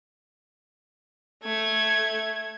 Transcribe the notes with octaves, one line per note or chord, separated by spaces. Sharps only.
A3 G#6